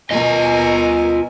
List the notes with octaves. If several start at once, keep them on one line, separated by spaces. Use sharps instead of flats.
B2 F4 A#4 D#5 G#5